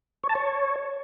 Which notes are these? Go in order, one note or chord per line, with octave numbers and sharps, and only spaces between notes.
C#5
A5
C#5